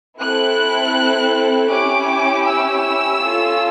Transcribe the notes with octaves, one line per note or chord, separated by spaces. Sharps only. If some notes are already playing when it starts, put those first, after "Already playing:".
C4 E4 A4 F#6
C#4 E4 G4 D6
E6
C#4 F4 A4